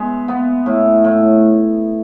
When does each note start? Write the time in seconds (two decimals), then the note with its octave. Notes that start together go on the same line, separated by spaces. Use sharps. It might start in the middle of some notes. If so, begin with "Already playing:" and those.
Already playing: G#3 B3 E5
0.28 B3
0.66 A2
1.04 A2